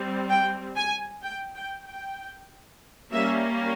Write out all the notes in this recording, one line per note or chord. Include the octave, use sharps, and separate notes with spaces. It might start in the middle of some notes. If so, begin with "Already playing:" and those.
Already playing: G3 C4
G5
G#5
G5
G5
G5
G3 A#3 C#4 E5